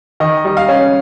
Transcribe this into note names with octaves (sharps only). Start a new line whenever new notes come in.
D#3 D#5
G3 D#5
F5
C#4